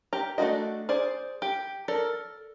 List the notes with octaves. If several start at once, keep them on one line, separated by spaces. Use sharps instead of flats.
G4 A#5
A3 C4 D4 F#4 D#5
G#4 C5 D5
G4
A4 A#4 D5